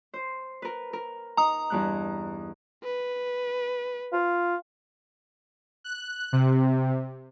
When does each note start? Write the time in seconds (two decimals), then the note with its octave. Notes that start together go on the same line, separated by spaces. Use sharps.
0.14 C5
0.62 A#4 B4
0.93 A#4
1.37 D#4 A#5 D#6
1.70 E2 G2 F#6
2.84 B4
4.13 F4
5.84 F#6
6.32 C3